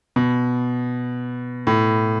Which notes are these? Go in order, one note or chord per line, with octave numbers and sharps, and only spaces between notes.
B2
A2